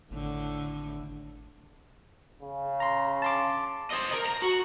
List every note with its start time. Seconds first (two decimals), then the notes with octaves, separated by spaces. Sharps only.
0.11 G#1 A2 D3
2.42 C#3
2.80 A#5 C6
3.22 A5 C6 D6
3.91 C5 D#5
4.13 A#4
4.26 A#5
4.42 F#4